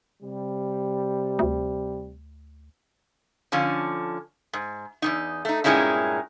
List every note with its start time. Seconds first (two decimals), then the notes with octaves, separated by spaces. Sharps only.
0.22 C3 G3
1.39 D2
3.52 D3 F3 C#4
4.53 G#2
5.02 E2 C#3 D#4
5.45 A3 D#4
5.64 G2 A#2 G#3 C#4 D#4 E4